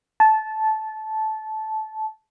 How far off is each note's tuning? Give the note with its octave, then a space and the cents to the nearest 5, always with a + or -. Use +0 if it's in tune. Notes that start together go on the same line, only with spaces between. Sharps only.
A5 -15